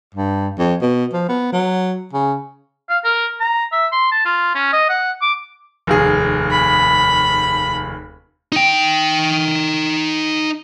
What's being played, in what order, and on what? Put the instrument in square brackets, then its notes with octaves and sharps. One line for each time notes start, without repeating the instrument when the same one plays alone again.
[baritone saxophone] G2
F2
B2
F3
B3
F#3
C#3
[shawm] F5
A#4
A#5
E5
C6
A5
F4
C#4
D#5
F#5
D6
[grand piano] F1 D#2 G#4
[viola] B5
[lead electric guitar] D#4 G5